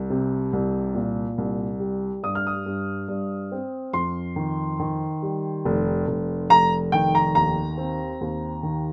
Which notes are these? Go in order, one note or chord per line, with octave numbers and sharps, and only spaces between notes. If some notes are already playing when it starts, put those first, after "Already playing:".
Already playing: C2
C3
C2
A#2
C2
G3
G2 D#6
F6
D#6
G2
G2
C4
F2 C6
D#3
D#3
G3
F1
F1
F1 A#5
D#3 G5
A#5
D#2 A#5
C4
D#2
D#3